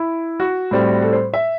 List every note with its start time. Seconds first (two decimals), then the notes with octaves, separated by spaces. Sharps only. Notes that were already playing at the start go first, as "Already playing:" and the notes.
Already playing: E4
0.40 F#4
0.71 A2 G3 C4
1.02 A4
1.13 C5
1.34 E5